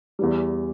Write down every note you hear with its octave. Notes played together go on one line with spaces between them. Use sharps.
E2 E3 G3